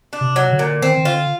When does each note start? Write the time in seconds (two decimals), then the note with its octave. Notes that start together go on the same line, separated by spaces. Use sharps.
0.13 D4
0.21 C3
0.36 F#3
0.52 D3
0.59 A#2
0.82 D#3 C4
0.97 D#3
1.05 D3 F4